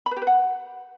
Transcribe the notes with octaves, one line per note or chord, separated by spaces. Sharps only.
B5
B4
G4
B4
F#5